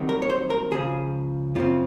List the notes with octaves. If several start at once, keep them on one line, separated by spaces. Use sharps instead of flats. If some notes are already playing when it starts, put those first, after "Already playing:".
Already playing: C2 C3 D#3 F#3
A#4
C#5
C5
A#4
C#2 C#3 F3 G#4
F#2 C#3 F3 C4 F4